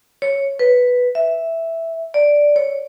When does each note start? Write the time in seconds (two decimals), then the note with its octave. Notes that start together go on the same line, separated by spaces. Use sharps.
0.22 C#5
0.59 B4
1.15 E5
2.14 D5
2.56 C#5